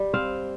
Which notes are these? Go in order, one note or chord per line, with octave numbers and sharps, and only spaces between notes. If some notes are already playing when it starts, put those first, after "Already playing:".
Already playing: G3
C4 F5